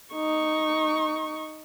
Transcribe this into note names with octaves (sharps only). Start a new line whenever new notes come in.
D#4 C#6